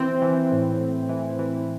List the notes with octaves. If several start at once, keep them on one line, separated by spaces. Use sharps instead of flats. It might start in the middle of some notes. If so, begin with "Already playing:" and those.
Already playing: E3 C4
E3
A2
A2
E3
E3